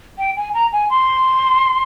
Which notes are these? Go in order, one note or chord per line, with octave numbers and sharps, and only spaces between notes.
G5
G#5
A#5
G#5
C6